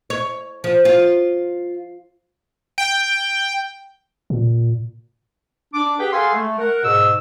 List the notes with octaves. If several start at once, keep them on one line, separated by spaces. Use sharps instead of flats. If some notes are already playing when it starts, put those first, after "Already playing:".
C#5
F3
F4
G5
A#2
D4 D6
G4 G#4 B4 F#5 G5
G#4 A4 F5 F#5 G#5 C6
A3
A#4 F#5
G#2 B2 G#4 E6